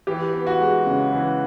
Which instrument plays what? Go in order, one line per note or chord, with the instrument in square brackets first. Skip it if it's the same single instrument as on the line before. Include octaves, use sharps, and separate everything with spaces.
[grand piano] E3 G4
B3
F#4
G#3
C#3
E3